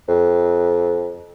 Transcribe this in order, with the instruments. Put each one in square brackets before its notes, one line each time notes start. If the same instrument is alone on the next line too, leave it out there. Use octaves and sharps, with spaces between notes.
[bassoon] F2